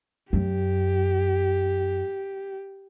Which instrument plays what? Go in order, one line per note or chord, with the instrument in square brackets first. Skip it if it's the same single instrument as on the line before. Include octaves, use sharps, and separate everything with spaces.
[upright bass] F#2 [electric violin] G4